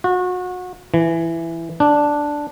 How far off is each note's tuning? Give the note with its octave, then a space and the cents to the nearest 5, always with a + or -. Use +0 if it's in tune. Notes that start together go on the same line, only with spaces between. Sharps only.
F#4 -30
E3 +10
D4 +0